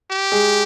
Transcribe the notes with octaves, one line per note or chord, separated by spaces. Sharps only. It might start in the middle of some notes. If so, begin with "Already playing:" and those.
G4
G#3 G#4